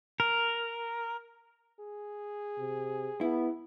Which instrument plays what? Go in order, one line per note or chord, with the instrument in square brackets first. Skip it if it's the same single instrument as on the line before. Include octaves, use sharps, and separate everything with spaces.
[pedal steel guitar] A#4
[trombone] G#4
[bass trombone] C3
[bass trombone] B3 [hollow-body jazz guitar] E4